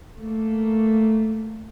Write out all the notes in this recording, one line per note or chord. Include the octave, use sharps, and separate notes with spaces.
A3 A#3